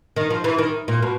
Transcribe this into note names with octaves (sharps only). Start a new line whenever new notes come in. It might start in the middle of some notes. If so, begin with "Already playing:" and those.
D#3
F3
E3
D#3
A#2
B2